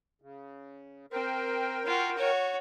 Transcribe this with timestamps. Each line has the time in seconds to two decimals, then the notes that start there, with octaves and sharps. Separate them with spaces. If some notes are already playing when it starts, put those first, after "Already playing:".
0.22 C#3
1.12 C4 A#4 G5
1.86 F4 F#4
2.17 F#4 C#5